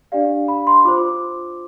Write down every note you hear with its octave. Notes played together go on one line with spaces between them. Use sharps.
D4 G4 D5 F5
B5
C6
F4 C5 D6